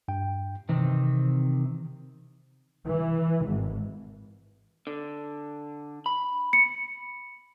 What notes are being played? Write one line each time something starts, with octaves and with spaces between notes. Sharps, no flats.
G2 G5
C3 D#3 E3 C4
E3
G#1
D3
B5
C#7